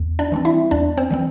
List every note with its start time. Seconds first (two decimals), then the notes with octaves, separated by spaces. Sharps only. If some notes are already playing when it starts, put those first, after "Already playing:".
Already playing: E2
0.19 D4 D5
0.32 E3 G3 C4
0.45 E4 E5
0.71 E2 D4 D5
0.98 C4 C5
1.11 E3 G3 C4